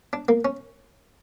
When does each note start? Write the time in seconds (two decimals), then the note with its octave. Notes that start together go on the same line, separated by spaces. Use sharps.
0.13 D4
0.29 A#3
0.45 C#4